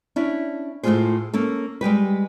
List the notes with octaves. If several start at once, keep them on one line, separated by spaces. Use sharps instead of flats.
C#4 D4 E4
A2 A3 D4 F4 G#4 C5
A#3 C#4 A4
G3 G#3 G4 B4